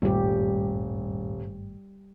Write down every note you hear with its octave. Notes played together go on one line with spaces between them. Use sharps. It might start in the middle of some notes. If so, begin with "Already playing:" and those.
D#1 G#1 G2 G3 A3 G4